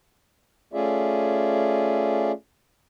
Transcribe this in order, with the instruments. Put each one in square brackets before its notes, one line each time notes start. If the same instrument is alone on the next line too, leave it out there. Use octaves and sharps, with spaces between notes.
[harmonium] A3 C#4 F4 G#4 D5 E5